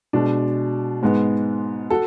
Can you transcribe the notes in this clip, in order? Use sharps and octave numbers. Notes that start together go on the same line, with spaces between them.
B2 G#3 D4
G#2 G#3 B3
F#4 A4